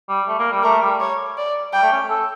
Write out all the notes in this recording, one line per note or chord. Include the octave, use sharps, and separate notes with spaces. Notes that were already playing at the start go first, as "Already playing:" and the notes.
G3
A3
A#3
G3
A3 A#4
G3
C#5
D5
G3 G5
A3
C#4
A4